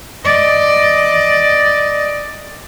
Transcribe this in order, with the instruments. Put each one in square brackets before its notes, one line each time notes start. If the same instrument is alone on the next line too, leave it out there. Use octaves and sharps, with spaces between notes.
[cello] D5 D#5